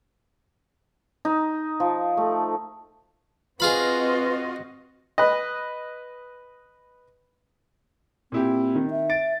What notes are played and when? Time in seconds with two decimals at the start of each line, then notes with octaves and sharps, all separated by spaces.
1.25 D#4
1.80 F3
2.17 A3
3.60 C4 F4 F#4 G#4 B4 D#5 F5 B5
5.18 B4 D#5
8.32 A#2 C4 E4 G4
8.75 D#3
8.91 E5
9.10 A6 D7